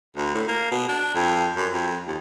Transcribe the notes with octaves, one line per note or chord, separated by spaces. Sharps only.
D2
A2
A#3
B2
D4
F2
F#2
F2
D#2